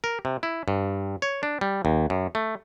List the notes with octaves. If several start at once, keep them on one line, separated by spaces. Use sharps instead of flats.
A#4
C3
E4
G2
C#5
D4
G3
D#2
F#2
A3